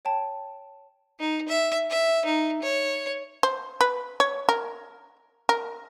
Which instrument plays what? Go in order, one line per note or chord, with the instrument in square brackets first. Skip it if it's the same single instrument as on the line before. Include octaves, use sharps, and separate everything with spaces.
[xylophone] C#5 G5 A5
[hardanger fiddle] D#4
E5
E5
D#4
C#5
[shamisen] C5
B4
C#5
A#4
A#4